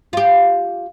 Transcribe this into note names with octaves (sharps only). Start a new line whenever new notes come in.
F4 G4